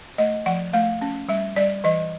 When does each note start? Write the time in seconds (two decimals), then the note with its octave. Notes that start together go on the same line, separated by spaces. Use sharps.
0.18 A3 D#5
0.46 F3 F#5
0.73 A3 F5
1.02 C#4
1.29 G3 E5
1.56 G3 D5
1.84 E3 D#5